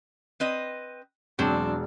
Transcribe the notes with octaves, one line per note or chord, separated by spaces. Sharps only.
C4 B4 D#5
E1 F#3 C4 D4